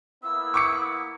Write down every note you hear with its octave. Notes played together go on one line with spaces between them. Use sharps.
A#3 B3 E4 E6
C#6 D6 C#7